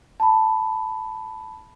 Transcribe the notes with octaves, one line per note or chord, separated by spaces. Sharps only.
A5 B5